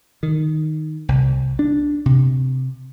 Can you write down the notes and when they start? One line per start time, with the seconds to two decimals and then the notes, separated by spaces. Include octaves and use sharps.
0.23 D#3
1.09 C2
1.59 D4
2.06 C3